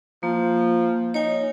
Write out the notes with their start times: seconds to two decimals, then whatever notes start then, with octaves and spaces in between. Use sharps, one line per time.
0.23 F3 A#3
1.14 D#4 C#5 G#5